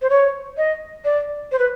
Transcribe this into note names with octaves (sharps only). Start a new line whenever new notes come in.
C5
C#5
D#5
D5
C5
B4